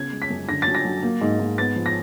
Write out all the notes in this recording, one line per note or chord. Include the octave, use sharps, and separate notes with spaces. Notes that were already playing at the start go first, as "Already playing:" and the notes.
Already playing: C#3 B3 G#6
G#3
B6
F#2
D3 A#6
F#3 A6
A#6
F#3
A#3
G#2
G#2
B3 A6
F3
A#6